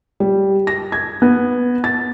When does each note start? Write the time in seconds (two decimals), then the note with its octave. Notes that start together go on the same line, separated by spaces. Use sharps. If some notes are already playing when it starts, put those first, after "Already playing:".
0.20 G3
0.67 A#6
0.92 G#6
1.22 B3
1.84 A6